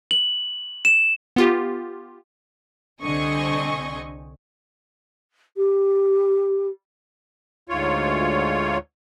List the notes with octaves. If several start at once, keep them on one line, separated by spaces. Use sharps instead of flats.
F#7
E7
B3 F4 G4
C2 D3 C4 D#5 G#5 C#6
G4
D2 G#2 F4 C#5